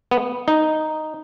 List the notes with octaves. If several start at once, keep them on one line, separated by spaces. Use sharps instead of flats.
B3
D#4